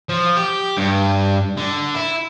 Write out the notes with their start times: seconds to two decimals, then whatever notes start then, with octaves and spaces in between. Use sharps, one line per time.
0.09 F3
0.37 G4
0.77 G2
1.57 D3
1.95 E4